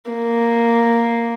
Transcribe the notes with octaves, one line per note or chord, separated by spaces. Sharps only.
A#3